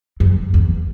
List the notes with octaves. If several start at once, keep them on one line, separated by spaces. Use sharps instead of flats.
F#2
E2